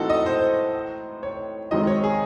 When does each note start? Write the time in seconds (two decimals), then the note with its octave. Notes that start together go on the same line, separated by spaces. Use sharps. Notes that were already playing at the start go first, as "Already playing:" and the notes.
Already playing: A2 E3 C4 D#4 F#4 A4
0.10 D#5
0.26 C5
1.23 C#5
1.71 F#2 D#3 G#3 C4 D#5
1.87 C#5
2.04 G#4